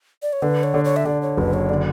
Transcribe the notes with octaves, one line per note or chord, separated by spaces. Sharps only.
D5
C#5
D3 B4
C#5
D3
C#5
E5
D3 D5
C#5
F#1 B4
C#5
D3 D5